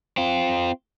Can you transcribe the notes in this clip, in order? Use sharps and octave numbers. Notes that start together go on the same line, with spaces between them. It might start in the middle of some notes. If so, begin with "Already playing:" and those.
C4 F4